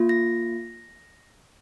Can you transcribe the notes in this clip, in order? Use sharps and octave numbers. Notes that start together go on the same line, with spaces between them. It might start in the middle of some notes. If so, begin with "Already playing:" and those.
Already playing: A#3 F4
A#6